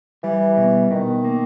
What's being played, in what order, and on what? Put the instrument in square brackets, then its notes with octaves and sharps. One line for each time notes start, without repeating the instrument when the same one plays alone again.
[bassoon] E3 [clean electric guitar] G3
[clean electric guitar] B2
[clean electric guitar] B2 [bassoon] D#3
[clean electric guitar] A#3